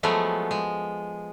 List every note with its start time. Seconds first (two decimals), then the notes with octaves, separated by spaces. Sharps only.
0.03 F3 F#3 G#3 A3 B3
0.51 G#3